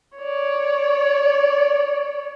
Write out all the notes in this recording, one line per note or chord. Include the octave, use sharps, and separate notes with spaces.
C#5 D5